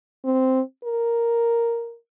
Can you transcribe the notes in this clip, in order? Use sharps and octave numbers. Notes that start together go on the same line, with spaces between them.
C4
A#4